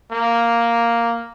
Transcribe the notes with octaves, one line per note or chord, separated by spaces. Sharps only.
A#3